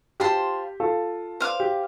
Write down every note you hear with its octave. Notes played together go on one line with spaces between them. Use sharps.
F4 G4 C5 A5 C6
F4 A4
C5 F5 D6
G4